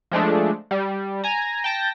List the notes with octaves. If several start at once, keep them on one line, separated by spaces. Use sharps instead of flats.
F3 G#3 A3 D4
G3
G#5 A#5
G5 A5 A#6